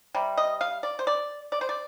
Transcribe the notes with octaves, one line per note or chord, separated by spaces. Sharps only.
C3 G3
D#5
F5
D5
C5
D5
D5
C5
D5